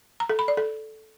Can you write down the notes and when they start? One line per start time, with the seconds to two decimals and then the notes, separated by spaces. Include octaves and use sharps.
0.20 A#5
0.29 A4
0.39 B5
0.48 D5
0.57 A4